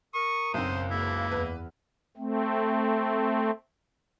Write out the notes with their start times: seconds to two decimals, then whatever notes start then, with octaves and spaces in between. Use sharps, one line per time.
0.14 A#4 C#6 D#6
0.54 F#1 B1 F#2 C4 C5
0.90 C#2 C#3 A#3 E4
1.32 E2 B4
2.17 A3 C4